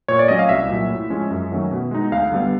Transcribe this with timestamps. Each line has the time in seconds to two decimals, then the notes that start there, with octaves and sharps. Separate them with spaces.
0.08 A#2 C#5
0.19 D5
0.28 F#3 A3 C#4 D#5
0.39 F5
0.49 C2 E5
0.69 A#2 F#3
0.90 A2
1.10 F3 G#3 C#4
1.31 F#2
1.51 D#3 F#3 A3 C#4
1.71 B2
1.91 G#3 B3 D#4
2.12 D2 F5
2.32 D3 G3 B3